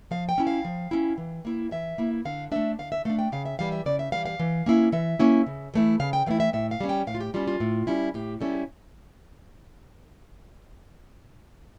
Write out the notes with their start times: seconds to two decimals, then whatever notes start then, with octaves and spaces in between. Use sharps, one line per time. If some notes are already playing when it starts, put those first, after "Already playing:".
0.11 F3 F5
0.29 G5
0.38 C#4 E4
0.47 F5
0.65 F3
0.91 C#4 E4
1.18 E3
1.45 A#3 E4
1.71 E3 E5
1.98 A#3 E4
2.25 D3 F5
2.52 A3 D4 E5
2.79 D3 F5
2.92 E5
3.05 A3 D4 F5
3.19 G5
3.32 C#3 F5
3.45 E5
3.59 E3 G3 F5
3.72 E5
3.86 C#3 D5
3.99 E5
4.12 E3 G3 F5
4.26 F5
4.39 E3
4.66 A#3 C#4 E4
4.92 E3 E5
5.19 A#3 C#4 E4
5.47 C#3
5.74 E3 A3 E4
6.00 C#3 F5
6.13 G5
6.26 E3 A3 E4 F5
6.40 E5
6.53 A2 E5
6.71 F5
6.81 G3 C#4
6.89 G5
7.07 A2 F5
7.15 F4
7.21 G4
7.34 G3 C#4 F4
7.47 F4
7.60 A2
7.87 G3 C#4 E4
8.14 A2 G4
8.41 G3 C#4 E4 A4